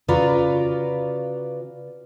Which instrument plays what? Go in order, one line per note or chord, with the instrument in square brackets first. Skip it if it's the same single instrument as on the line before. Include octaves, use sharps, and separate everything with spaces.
[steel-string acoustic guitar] C#3 F4 F#4 B4 D5 A#5